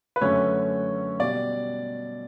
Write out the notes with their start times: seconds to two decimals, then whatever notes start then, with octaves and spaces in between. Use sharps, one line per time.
0.16 B4
0.21 F#2 D3 F#3 A3 C#4 C#5
1.20 B2 G3 D5